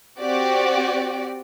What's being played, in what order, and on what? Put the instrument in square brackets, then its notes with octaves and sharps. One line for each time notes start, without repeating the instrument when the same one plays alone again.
[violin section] C4 F#4 G4 D5